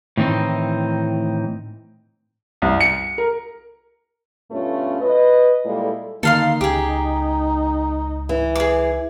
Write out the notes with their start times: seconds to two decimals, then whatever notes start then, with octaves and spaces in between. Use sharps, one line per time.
0.17 A2 D#3 E3 G3 C4 D#4
2.62 C2
2.81 C#7
3.18 A#4
4.51 G2 B2 A3 C#4 F4
5.01 B4 D#5
5.65 A#2 G3 G#3 E4 A4
6.23 D3 D#3 A#3 D#4 A4 F5 C6
6.61 C#2 G4 G#4
8.29 E3
8.56 G#4 D6